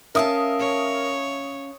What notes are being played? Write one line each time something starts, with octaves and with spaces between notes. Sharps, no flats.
C#4 A#4 E5 F5 A5 D#6
C#5